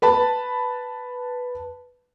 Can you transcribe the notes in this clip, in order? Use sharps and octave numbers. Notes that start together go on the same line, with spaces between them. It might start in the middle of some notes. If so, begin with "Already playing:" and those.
B4 A5 B5